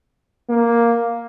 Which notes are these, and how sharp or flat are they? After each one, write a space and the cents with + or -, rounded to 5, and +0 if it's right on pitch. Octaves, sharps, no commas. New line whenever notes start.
A#3 +0